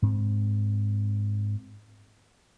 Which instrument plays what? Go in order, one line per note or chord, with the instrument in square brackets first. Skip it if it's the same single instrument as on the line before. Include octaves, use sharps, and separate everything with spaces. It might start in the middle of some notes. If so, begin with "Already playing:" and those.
[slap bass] G#2 C4